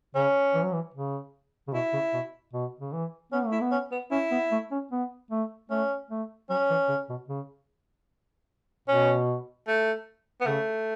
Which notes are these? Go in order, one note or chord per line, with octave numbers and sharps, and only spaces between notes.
C#3 C#4
E3
F#3
E3
C#3
C#3
B2 E4
C#3
B2
B2
C#3
E3
B3 C#4
A3
E4
B3
C#4
B3
C#4 E4
B3
A3
C#4
B3
A3
A3 C#4
A3
F#3 C#4
E3
C#3
B2
C#3
B2 C#4
A3
B3
C#3 A3